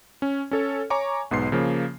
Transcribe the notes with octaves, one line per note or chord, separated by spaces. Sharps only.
C#4
C#4 A4 C#5
C#5 G#5 A#5 C#6 D6
B1 G#2 B3 C6 C7
C#3 F3 A#3